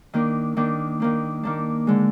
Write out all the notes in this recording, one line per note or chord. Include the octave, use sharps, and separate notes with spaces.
D#3 A#3 D4
D#3 A#3 D4
D#3 A#3 D4
D#3 A#3 D4
D3 G#3